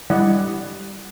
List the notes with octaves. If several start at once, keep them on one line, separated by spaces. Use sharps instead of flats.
G3 E4 D5 D#5 F#5